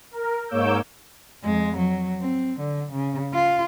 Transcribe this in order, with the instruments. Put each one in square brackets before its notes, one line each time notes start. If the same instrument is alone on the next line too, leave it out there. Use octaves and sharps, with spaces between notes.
[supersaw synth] A#4
G#2 A#3 C#5 D6 E6 G6
[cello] F2 G#3
F#3
C4
D3
C#3
F4